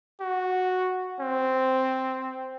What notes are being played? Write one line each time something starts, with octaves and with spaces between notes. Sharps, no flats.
F#4
C4